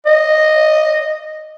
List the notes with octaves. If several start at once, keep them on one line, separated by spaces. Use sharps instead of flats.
D#5